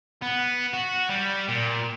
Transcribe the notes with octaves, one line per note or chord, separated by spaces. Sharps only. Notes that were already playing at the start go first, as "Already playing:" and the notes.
B3
F#4
G3
A#2